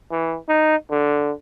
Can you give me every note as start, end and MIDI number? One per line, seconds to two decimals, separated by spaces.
0.11 0.37 52
0.48 0.76 63
0.91 1.32 50